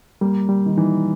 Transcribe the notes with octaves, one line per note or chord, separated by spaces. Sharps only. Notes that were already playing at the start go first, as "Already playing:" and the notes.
G3 A#3
G3
D#3
E3 D#4